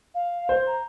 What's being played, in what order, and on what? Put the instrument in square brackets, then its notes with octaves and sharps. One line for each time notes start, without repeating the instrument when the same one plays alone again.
[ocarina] F5
[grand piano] C5
[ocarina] A#5